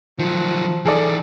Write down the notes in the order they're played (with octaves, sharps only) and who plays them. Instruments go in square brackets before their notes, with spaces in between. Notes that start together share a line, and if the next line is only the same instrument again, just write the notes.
[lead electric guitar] D#3 F#3 [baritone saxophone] F3
[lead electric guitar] E3 D#4 [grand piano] G#4 A4 D5